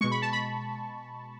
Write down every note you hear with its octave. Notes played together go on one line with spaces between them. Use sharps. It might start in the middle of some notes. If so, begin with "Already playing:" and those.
B2 G#3 C#6
B5
A5
B5